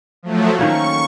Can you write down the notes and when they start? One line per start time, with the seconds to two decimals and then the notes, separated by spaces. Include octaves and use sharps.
0.23 F3 F#3 A3
0.59 D#3 A#3 C#4 C#6